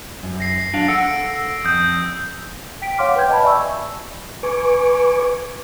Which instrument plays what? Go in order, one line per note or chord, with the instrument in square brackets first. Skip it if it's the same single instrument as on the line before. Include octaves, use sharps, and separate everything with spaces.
[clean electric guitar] F#2
[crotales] A#6 C7
[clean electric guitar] F#3 D4 F5
[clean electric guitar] A4 F#5 [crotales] E6 D7
[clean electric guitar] F2 [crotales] D#6 G6
[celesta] G5 B6 D7
C#5 F5 F#5 C6 D6 F6
B4 G5 G6 G#6
D#5 A5 B5
D5 E5 G#5 A5 C#6 E6
[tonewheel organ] B4 G#5 C#6 D6